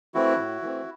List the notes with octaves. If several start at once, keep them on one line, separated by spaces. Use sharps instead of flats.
E3 A3 C4 E4 F#4
A2
E3 A3 C4